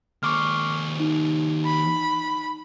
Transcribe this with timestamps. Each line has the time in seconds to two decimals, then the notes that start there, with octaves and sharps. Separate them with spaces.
0.23 D#2 C5 C#6 D6 F6
1.00 D#4
1.66 B5